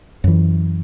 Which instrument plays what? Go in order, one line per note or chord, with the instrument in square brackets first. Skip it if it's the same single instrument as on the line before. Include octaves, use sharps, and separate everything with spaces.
[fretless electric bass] F#2 E3